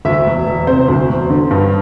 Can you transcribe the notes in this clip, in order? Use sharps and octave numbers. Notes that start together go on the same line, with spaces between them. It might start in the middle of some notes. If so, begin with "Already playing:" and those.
D2 E5
E1
E1
C3 C5
D2
E1
D3
G2